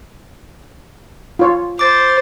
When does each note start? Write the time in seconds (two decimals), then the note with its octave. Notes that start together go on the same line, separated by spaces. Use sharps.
1.39 F4 C#5
1.79 C5 D6 A6